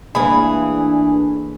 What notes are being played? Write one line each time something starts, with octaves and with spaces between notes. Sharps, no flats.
A1 E3 A#3 D4 G#4 B5